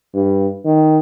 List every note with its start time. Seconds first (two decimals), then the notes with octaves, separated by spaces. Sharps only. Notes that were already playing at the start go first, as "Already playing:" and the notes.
0.14 G2
0.65 D#3